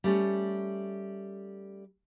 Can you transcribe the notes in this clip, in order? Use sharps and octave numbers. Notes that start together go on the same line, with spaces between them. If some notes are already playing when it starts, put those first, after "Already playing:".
G3 A3 C#4